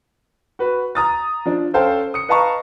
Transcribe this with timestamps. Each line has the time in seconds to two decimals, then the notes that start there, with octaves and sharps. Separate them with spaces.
0.59 F#4 B4
0.95 A#5 D#6 A6
1.46 F3 D4
1.74 C#4 A4 C5 F5 G5 A5
2.14 D#6 C#7
2.29 B4 D#5 F5 A5 A#5 C#6